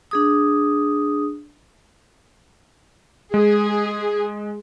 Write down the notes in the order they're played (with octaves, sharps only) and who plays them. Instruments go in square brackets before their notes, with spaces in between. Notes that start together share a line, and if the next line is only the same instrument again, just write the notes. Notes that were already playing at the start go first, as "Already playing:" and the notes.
[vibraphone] D4 G#4 D#6
[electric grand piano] G#3 [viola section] G#4